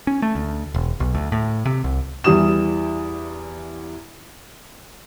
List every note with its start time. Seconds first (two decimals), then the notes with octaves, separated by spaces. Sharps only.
0.07 C#4
0.22 A3
0.35 D2
0.74 E1
1.00 B1
1.15 D2
1.32 A2
1.65 C3
1.84 C2
2.24 E2 E3 G3 D#6 E7